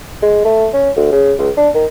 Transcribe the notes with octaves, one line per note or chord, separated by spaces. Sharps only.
G#3
A3
C#4
D2
C#3
C#2
D4
D#3